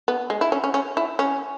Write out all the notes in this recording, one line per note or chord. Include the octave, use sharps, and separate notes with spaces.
B3
G#3
E4
C#4
C#4
C#4
E4
C#4